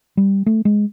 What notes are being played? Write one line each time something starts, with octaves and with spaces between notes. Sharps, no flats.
G3
A3
G#3